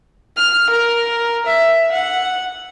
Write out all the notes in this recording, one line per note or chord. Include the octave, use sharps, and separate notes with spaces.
F6
A#4
E5
F#5